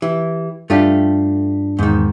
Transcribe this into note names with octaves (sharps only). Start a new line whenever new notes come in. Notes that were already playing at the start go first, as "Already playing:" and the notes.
E3 G4
G2 A3 D4 F4 G4
E2 G#2 D#3